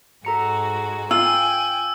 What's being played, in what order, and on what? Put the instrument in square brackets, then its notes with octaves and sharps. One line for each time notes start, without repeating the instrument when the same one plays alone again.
[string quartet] G#2 G#3 F#4 [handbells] A4 A#5 C#7
[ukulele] F4 [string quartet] G5 G#5 [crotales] E6